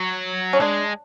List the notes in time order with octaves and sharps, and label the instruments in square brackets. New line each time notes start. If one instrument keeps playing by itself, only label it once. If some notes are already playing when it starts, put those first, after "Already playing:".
Already playing: [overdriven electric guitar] F#3
[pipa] C#4
[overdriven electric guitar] G#3 [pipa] D4